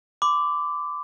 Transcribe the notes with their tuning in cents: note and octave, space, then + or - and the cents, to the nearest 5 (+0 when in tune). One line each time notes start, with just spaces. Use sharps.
B5 +45 D6 -5